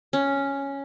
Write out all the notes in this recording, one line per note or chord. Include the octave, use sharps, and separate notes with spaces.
C#4